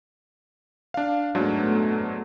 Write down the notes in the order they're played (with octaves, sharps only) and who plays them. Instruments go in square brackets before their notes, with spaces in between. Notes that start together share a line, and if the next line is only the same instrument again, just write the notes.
[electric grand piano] D4 F5
[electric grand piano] G#2 F#3 D4 [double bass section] A3 B3